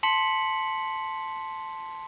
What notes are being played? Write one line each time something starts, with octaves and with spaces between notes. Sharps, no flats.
A5 C6 B6 C#7 F#7